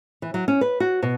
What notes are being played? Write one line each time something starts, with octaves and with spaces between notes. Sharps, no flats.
E3
F#3
C#4
B4
F#4
B2